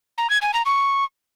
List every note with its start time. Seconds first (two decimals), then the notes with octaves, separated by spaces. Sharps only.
0.18 A#5
0.30 G#6
0.42 G#5
0.54 A#5
0.66 C#6